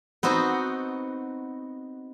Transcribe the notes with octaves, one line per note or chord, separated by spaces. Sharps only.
B3 C4 D#4 F#4